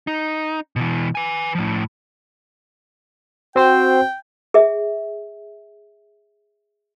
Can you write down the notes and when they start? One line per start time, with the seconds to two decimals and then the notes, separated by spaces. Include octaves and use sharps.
0.07 D#4
0.76 B2 E3
1.15 B4 G#5
1.55 A2 F3
3.56 C4 F#4 C5 G5
4.54 G#4 E5